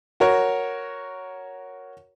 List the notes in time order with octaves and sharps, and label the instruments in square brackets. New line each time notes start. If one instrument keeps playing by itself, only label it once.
[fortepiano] F#4 A#4 C#5